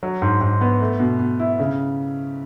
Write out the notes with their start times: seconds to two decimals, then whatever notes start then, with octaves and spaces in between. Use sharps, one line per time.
0.03 F#3
0.22 G#2
0.41 G#2
0.61 B3
0.81 A3
1.00 B2
1.19 B2
1.39 E4
1.60 C#3